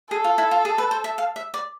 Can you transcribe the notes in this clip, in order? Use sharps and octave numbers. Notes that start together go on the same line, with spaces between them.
G#4 A4
F4
E4
F4
G#4
B4
C5
E5
F5
E5
D5